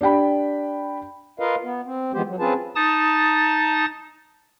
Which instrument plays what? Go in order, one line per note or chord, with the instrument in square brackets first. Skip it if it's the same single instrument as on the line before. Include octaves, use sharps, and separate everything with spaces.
[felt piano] D4 G4 G5 B5
[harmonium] F4 A#4 B4 D#5 F5
B3
C4
E3 F3 G#3 B3 G4 C5
F#3
C4 C#4 F4 G#4 B4 A5
[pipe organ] D#4 A5 D#6 A6